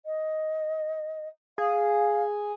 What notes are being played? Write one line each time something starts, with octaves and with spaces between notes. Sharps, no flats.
D#5
G#4 F5